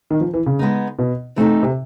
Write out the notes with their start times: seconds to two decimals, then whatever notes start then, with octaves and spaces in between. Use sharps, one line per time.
0.11 D#3
0.21 F3
0.33 E3
0.46 C#3
0.59 G#3 B3 D#4
0.99 B2
1.36 C3 E3 A3 C4 D#4
1.63 C3